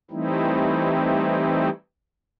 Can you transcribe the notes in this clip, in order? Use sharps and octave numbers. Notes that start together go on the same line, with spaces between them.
E3 G3 A3 C4 D#4 E4